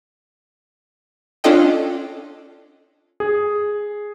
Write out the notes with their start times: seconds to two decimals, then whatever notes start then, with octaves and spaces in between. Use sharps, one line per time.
1.44 C#4 D4 F4 A4 D#5 G5
3.20 G#4